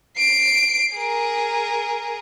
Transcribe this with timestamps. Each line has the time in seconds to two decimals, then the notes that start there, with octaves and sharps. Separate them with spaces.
0.17 C7 D7
0.94 G#4 A#4